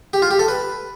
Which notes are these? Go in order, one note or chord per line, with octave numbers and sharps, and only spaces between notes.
G4
F4
G4
A4
B4